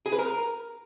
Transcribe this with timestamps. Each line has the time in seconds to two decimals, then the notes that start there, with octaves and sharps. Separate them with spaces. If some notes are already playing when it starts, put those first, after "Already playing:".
0.06 G#4
0.12 B4
0.19 A#4